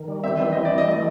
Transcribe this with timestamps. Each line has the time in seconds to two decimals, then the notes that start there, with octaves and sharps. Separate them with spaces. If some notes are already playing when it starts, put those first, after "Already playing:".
Already playing: D#3
0.08 G3
0.24 C4 E5
0.39 E3 E5
0.52 G3 D#5
0.65 D5
0.71 E3
0.78 D#5
0.87 A3